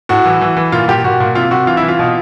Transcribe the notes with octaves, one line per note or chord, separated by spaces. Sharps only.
A2 F#4
E3
E3
E3
A#2 F4
A#2 G4
A#2 F#4
A#2
C3 F4
C3 F#4
E3 F4
E4
E3
F4
B2